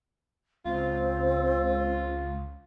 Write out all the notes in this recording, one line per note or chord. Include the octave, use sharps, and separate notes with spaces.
C#2 C4 F4